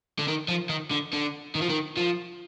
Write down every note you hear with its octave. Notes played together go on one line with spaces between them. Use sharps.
D3
D#3
F3
D#3
D3
D3
D#3
F3
D#3
F3